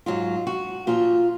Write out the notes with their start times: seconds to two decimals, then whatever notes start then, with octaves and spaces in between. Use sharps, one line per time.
0.06 G#2 F#3 F4
0.47 F#4
0.87 A#2 F3 F4